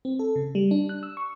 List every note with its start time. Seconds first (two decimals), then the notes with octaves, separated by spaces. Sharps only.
0.05 C4
0.19 A4
0.36 C#3
0.55 G3
0.71 D4
0.89 F#6
1.03 E6
1.17 C#6